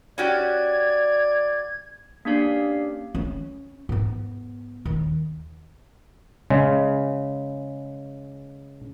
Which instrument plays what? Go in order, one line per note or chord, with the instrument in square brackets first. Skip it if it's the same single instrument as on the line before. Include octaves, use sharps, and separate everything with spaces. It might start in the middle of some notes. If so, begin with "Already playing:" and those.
[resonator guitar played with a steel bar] C#4 F#4 G4 [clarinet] D5 [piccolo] G#6
[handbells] A#3 C#4 D4 G4 D5 F5
[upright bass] C#4
G#2 B3
D#2
[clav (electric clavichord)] C#3 G#3